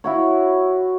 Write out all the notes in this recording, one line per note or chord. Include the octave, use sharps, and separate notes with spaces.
E4 F#4 C#5